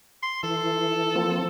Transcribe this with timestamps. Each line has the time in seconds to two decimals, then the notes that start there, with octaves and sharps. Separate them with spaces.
0.23 C6
0.43 E3 A4
1.16 F3 A#3 C4